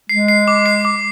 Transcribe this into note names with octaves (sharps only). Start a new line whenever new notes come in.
G#3 C7
C7
D6
C7
D6